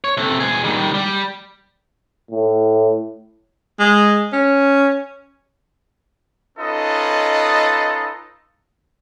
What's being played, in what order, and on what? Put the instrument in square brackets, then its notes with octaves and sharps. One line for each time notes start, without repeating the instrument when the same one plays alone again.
[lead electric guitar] C#5
C3 A3
B2 G#4
D#3 G3
G3
[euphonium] A2
[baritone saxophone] G#3
C#4
[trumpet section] C#4 D#4 F4 A4 B4 D#5